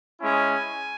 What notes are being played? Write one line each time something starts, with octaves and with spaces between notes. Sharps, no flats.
G#3 C#4 E4 G#5